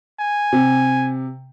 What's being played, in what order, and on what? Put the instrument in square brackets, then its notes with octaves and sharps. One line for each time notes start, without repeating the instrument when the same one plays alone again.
[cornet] G#5
[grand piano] C3